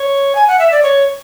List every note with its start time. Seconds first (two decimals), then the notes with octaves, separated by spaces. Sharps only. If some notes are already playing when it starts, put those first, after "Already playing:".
Already playing: C#5
0.35 G#5
0.47 F#5
0.59 E5
0.71 D5
0.83 C#5